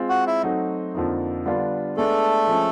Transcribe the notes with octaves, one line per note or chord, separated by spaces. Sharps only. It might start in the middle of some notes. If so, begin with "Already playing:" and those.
Already playing: G#3 C4 F4
F#4 F#5
E4 E5
F#3 A3 C4 D#4 F#4
F2 D3 F3 A#3 D#4
D3 G3 B3 D4 F4
G#3 A3 B3 D4 A4
F3 G#3 C#4